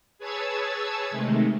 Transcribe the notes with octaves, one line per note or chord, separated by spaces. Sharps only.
G#4 B4 C#5 A5 E6 G#6
C3 D#3 G#3 A3